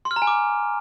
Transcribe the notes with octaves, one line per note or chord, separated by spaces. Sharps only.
C6
F6
A#5
G#5
D6